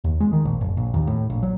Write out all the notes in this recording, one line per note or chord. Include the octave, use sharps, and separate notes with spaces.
D#2
G#3
D#3
A#1
F#1
A#1
D#2
A2
A#1
F#3